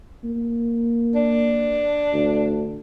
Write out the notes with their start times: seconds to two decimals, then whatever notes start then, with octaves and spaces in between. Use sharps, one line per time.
0.25 A#3
1.15 D4
2.13 D2